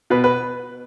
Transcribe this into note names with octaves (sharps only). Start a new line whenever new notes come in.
B2 B4
B4